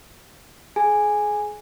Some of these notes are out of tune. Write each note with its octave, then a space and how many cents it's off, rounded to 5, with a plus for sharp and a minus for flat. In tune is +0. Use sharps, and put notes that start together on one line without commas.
G#4 +30 G#5 -5